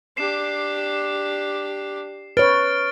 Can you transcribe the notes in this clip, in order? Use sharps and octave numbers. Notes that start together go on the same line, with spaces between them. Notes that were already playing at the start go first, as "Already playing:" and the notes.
D4 G4 C7 E7
B4 C#5 F6 A6 D7